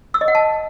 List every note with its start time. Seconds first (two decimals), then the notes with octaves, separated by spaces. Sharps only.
0.14 E6
0.21 D#5
0.28 F#5
0.35 A5